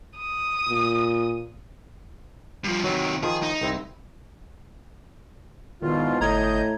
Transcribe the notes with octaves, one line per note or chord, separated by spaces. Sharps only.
D#6
A#2
G2 F3
C3 D#3 F#3
D#3 F3 G#4
D#4
C2 C4 E4
E2 G#2 B2 D#3 F4
G1 A2 D#5 A#5 G6 G#6